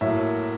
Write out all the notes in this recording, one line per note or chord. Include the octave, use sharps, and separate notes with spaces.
A2 F#3 A#3 E5